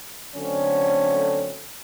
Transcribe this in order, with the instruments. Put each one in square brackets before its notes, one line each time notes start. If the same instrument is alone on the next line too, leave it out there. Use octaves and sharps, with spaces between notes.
[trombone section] D3 F#3 A3 C4 C#4